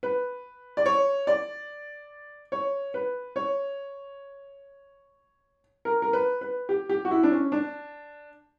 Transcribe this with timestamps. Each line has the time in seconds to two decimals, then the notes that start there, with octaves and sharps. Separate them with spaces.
0.03 B4
0.77 D5
0.86 C#5
1.27 D5
2.52 C#5
2.94 B4
3.36 C#5
5.85 A#4
6.02 A#4
6.13 B4
6.41 B4
6.69 G4
6.89 G4
7.05 F#4
7.11 E4
7.23 D4
7.31 C#4
7.52 D4